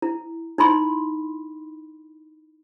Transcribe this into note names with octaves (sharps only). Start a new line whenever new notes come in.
E4
D#4 E4 B5 C6